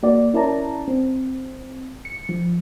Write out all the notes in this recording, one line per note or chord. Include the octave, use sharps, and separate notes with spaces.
A#3 F#4 D5
C#4 E4 A#4 D5 A5 A#5
C4
C#7
F3